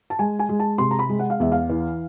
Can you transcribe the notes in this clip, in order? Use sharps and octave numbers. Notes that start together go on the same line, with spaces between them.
A5
G#3 G#5
G#5
G#3
A5
C3 C6
A#5
B5
G#3
F#5
F5
E2 E5
F5
E3